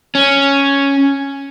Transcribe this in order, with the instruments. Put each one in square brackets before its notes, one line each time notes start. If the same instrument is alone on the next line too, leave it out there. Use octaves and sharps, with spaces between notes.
[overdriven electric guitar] C#4